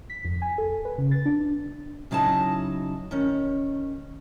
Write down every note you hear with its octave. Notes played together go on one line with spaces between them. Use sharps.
B6
F2
G#5
A4
B4
C#3
A6
D4
C#3 F#3 D#4 E4 A5
D#3 C#4